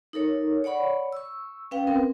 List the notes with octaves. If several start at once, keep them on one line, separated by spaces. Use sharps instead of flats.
D#4 A4 A#4 C#5
C#5 D5 F#5 B5 C#6
C#6 E6
C#4 B4 F5 G5
C4 A#4